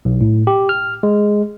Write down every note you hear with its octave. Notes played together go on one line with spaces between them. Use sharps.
B1
A2
G4
F6
G#3